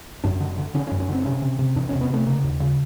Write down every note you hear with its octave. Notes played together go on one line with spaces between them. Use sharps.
F#2 D4
D3
D3
D3 C#4
C#4
F#2
C#4
D3 C4
C3 C#4
C3
C3
E2 D4
C3 C#4
B3
C3 A3
C#3 A#3
D#2
C#3